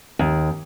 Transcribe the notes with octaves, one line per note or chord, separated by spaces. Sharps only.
D#2